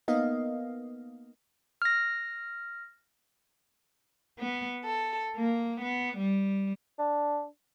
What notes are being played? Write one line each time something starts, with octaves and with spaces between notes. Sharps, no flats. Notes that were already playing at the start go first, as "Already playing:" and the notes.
A#3 B3 D#4 D#5 F5
F6 A#6
B3
A4
A#3
B3
G3
D4